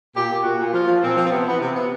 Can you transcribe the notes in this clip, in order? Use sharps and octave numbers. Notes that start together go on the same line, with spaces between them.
A#2 G4
A#2
A#2 F#4
A#2
F3 F4
F3
A#2 C4
F3
C4
C3 B3
E3 B3
C3 C4
C3 B3